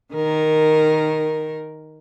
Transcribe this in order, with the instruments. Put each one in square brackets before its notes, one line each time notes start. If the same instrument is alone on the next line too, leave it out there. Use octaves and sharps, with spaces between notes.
[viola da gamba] D#3 A#4